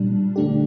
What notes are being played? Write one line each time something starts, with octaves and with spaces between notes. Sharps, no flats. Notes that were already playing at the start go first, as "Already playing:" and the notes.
Already playing: A#2 G3 D4
D3 A3 D4 G4